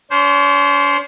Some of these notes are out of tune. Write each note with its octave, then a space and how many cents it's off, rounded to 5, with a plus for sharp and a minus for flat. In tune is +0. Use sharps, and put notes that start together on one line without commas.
C#4 +45 C5 +0